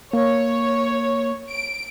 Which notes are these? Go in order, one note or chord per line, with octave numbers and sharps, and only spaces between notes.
A#3 C#5
D7